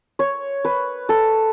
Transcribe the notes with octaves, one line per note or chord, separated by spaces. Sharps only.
C#5
B4
A4